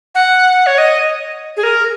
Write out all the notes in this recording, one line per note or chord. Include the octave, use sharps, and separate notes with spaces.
F#5
C#5
D#5
G#4
A#4